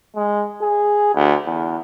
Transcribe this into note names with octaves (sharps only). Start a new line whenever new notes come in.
G#3
G#4
D2
E2